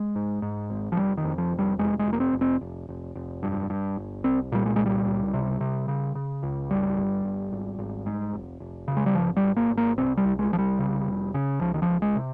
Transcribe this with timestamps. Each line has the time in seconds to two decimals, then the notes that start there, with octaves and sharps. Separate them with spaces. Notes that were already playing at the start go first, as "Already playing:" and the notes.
Already playing: G#3
0.15 G#2
0.42 G#2
0.70 G#1
0.92 F3
0.97 F1 G3
1.17 D#3
1.24 F2
1.38 F3
1.52 F1
1.59 G3
1.79 F1 G#3
1.99 G#3
2.06 F1
2.13 A#3
2.20 C4
2.33 F1
2.41 C4
2.61 F1
2.89 F1
3.15 F1
3.43 G2
3.70 G2
3.97 G1
4.24 C2 C4
4.52 A#2 G3
4.66 G#3
4.76 C2 G#3
4.86 G3
5.06 C#2
5.34 C3
5.61 C3
5.88 C#3
6.15 C#3
6.43 C#2
6.70 G1 G3
6.97 G1
7.25 G1
7.52 G#1
7.79 G#1
8.06 G#2
8.33 F1
8.60 F1
8.88 C#3
8.97 G#3
9.06 G3
9.15 G#1 F3
9.37 G3
9.43 G#1
9.56 A#3
9.70 G#1
9.77 A#3
9.97 C2 C4
10.17 G3
10.25 C2
10.39 G#3
10.52 C2 F3
10.58 G3
10.79 C#3
11.06 F1
11.34 C#3
11.61 C#2 F3
11.74 D#3
11.82 F3
11.89 C#2
12.02 G#3
12.16 C3